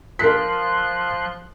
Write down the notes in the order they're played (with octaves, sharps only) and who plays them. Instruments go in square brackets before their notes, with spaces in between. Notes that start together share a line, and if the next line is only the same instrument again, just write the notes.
[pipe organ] F3 C6 F#6 [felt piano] A#4 B6